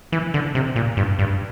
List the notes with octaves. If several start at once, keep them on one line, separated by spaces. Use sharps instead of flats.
E3
D3
C3
A#2
G2
G2